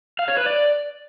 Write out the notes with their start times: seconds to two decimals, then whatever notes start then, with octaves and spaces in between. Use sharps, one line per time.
0.19 F5
0.28 C#5
0.37 B4
0.46 D5